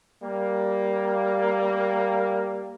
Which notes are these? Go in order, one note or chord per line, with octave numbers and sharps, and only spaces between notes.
G3 A#3